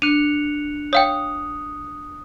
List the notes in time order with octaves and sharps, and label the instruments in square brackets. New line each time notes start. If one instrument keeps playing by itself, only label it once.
[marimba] D4 [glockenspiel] F#6 C#7 F7 [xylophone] D#7
[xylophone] C#5 F5 G5 [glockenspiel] D#6